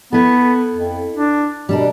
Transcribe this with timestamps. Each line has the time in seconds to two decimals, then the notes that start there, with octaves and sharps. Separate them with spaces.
0.13 B3 E4 A4
0.75 F2
1.16 D4
1.69 B2 G3 D4 A#4